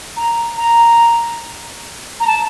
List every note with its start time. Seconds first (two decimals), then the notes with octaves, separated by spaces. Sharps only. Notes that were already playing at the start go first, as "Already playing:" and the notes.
0.17 A#5
0.57 A#5
2.20 A#5
2.27 A5